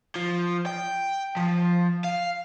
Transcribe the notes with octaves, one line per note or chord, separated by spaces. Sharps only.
F3
G5
F3
F5